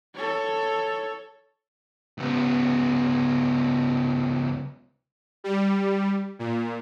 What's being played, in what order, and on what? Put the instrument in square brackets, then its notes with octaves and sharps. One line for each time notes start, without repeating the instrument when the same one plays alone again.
[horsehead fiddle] A4 C#5
[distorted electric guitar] C#2 B3
[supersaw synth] G3
A#2